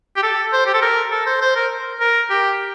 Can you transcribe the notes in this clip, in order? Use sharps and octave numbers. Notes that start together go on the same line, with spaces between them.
G4
A4
C5
G4
A4
A#4
A4
C5
C5
A#4
A#4
G4